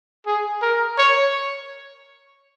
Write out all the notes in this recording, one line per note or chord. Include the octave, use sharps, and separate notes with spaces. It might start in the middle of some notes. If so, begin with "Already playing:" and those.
G#4
A#4
C#5